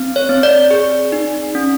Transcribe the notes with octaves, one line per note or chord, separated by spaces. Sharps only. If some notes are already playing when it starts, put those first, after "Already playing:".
Already playing: C4
C#5
C4
D5
G#4
D#4
C#4